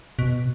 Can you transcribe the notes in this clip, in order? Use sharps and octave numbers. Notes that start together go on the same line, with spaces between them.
B2